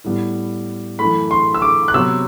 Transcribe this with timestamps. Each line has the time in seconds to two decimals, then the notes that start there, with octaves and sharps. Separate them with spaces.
0.04 A2 G3 B3
0.99 F#2 E3 A3 B5
1.31 C6
1.54 E6
1.62 D6
1.88 F#6
1.94 C3 F#3 B3 E6